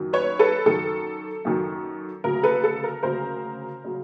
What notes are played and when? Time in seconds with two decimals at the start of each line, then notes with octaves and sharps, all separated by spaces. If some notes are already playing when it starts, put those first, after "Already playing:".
Already playing: F#2 D#3 F#3
0.13 B4 C#5
0.39 A4 B4
0.66 F#2 D#3 F#3 A4
1.45 F#2 D#3 F#3
2.24 D2 C#3 F#3 A#4
2.43 A4 B4
2.64 A4
2.84 A#4
3.03 D2 C#3 F#3 A#4 C5
3.84 C#3 F#3